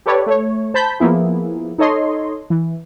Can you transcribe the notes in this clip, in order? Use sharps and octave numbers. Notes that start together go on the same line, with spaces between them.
G4 A4 B4 C#5 D5
A3 C#5
C5 A5 B5 G6 B6
F3 A#3 B3 E4 G#4
D#4 A4 C#5 D#5 C6
E3